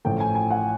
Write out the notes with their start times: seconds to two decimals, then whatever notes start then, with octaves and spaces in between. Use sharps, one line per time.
0.05 A1 A2 F3 A3 G5
0.20 G#5
0.35 G#5
0.51 F#5